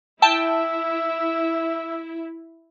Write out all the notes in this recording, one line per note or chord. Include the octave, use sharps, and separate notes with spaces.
E4 E5 G5 A5